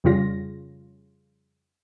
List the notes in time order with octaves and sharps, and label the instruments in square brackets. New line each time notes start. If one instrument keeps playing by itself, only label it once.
[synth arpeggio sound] F2 C#3 G3 F4 A#6